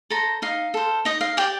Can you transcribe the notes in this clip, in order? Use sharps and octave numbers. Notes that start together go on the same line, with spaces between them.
A4 C5 A#5
D#4 F5
A4 C5
D#4 D#5
F5
G4 D5 G5